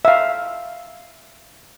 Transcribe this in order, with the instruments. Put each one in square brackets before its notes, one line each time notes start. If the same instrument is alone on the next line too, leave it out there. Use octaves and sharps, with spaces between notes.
[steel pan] E5 F5